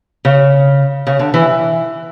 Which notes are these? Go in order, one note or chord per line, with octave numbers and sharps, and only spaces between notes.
C#3
C#3
D3
E3